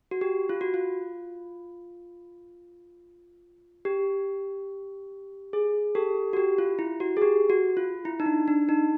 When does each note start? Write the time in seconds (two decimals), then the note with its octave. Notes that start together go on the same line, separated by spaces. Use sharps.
0.11 F#4
0.21 G4
0.49 F4
0.61 F#4
0.74 F4
3.85 G4
5.53 G#4
5.95 G4 A4
6.33 F#4
6.37 G4
6.58 F4
6.79 E4
7.00 F#4
7.17 G#4
7.22 G4
7.50 F#4
7.77 F4
8.05 E4
8.20 D#4
8.26 D4
8.48 D4
8.69 D#4